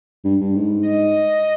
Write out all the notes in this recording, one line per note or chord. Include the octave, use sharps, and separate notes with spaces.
G2
G2
G#2
D#5